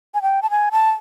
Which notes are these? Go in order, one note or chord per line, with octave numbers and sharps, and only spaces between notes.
G#5
G5
A5
G#5
A5